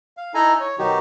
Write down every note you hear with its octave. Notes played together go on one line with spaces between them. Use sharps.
F5
D#4 E4 A4 G#5 A#5
C#5
B2 D#3 F#3 D#4 F#4 G4